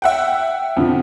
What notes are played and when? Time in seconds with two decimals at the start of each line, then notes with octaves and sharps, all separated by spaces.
0.02 E5 F#5 G5
0.77 F2 D3 F3